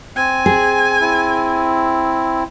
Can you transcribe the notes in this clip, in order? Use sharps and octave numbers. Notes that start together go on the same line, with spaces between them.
C4 G#5
G#4
C4 E4